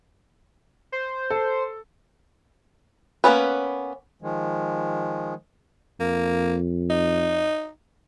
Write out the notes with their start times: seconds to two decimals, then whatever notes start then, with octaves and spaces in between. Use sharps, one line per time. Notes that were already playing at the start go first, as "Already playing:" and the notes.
0.92 C5
1.30 A4
3.24 A#3 B3 C#4 B4
4.22 D#3 F3 G#3
6.00 F2 A#3
6.90 D#4